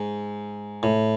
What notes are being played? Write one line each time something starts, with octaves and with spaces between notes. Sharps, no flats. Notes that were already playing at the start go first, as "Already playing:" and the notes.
Already playing: G#2
A2